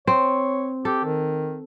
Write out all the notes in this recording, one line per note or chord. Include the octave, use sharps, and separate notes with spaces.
C4 C#5
G4 A4
D#3